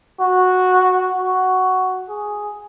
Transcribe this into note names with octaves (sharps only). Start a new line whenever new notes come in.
F#4
F#4
G#4